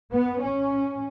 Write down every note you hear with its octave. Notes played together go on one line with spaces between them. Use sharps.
B3
C#4